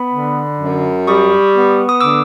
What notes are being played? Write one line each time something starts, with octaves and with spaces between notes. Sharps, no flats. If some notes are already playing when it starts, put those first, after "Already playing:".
Already playing: B3 B5
D3
F#2
G3 C#6 D#6
B3
D#6
D3 D6 E6